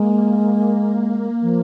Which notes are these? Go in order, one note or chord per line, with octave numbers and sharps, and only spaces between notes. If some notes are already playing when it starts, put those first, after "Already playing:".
Already playing: G#3 A#3
F3